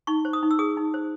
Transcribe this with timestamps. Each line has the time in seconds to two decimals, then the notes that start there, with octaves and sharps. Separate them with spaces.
0.07 D#4 C#6
0.25 C5
0.33 D#6
0.43 D#4
0.51 E6
0.59 G#4 D#6
0.77 D#4
0.94 C5